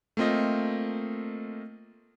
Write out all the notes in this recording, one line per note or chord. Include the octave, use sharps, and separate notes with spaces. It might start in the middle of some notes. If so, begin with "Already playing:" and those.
A3 A#3 C4 F4 D#5